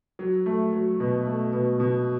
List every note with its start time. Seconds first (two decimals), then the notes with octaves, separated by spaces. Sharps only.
0.19 F#3
0.46 A3
0.73 F#3
1.00 B2
1.26 A3
1.53 B2
1.80 B2